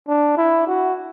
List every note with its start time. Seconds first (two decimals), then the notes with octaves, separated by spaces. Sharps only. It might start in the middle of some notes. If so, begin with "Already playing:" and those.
0.08 D4
0.37 E4
0.67 F#4